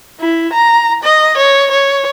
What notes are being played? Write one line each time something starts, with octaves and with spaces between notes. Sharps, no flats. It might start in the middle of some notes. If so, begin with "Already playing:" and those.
E4
A#5
D#5
C#5
C#5